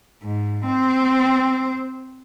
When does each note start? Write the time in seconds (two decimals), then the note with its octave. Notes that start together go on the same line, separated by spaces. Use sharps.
0.23 G#2
0.66 C4 C5